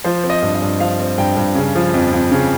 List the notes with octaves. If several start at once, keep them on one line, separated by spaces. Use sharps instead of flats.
F3 C5
C4
D#5
G2
D#5
G2
F3 F5
C4
G2 G5
G2
C#3
F3
F2
F2
C#3